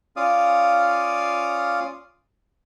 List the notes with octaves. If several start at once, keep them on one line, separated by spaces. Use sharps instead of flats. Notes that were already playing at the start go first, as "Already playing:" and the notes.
C#4 F4 D5 F5 D#6